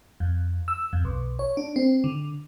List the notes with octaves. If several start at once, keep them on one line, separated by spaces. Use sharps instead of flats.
F2
E6
F2
B1
C#5
D4
C4
D3